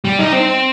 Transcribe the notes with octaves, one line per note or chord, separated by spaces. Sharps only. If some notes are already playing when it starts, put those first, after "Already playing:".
G3
D#4
C4